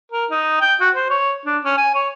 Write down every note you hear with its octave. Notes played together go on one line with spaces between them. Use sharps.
A#4
D#4
G5
F#4
C5
C#5
D4
C#4
G#5
C#5